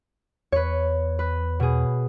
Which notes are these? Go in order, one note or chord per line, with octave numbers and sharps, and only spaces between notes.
E2 B4 C#5
B4
B2 G#4